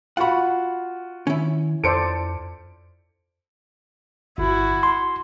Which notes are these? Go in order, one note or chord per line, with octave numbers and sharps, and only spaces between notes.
F4 F#4 F#5 B5
D#3 C#4 E4
F2 A4 C5 D5 C#7 D7
G1 E4 F#4
C6